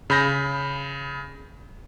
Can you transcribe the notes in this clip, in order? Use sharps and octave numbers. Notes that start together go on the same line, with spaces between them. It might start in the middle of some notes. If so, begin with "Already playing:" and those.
C#3 B5 G6 A#6